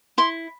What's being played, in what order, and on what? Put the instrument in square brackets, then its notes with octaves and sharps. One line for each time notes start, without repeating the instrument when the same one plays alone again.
[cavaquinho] E4 C6